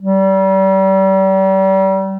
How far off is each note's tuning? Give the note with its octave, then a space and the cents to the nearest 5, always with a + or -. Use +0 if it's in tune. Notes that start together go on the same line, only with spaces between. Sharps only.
G3 -35